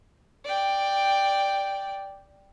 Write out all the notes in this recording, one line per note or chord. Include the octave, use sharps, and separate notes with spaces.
D5 G5